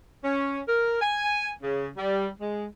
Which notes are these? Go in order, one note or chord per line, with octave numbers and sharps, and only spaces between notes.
C#4
A#4
G#5
C#3
G3
G#3